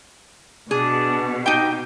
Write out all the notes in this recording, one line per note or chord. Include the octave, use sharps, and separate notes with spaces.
B2 D4 G#4
D#4 G4 G5